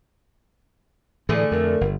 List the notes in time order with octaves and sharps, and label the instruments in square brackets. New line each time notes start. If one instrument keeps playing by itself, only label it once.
[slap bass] A2 E3 [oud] D3 A3 G#4
[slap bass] F2 [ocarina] A#4
[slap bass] G1